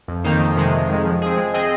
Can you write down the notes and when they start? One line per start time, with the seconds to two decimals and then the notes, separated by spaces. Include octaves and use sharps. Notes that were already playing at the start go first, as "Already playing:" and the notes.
0.08 F2
0.24 D#3 A#3 D#4 C5
0.39 F2
0.56 C3 D#3 G#3
0.73 F2
0.89 D#3 G#3
1.05 F3
1.22 C4 G#4
1.37 G#3
1.54 C4 G#4 D#5